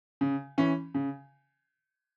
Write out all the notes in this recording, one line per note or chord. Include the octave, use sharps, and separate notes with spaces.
C#3
E3 C#4
C#3